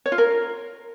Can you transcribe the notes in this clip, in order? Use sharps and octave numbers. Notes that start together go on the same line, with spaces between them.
C#5
F4
A#4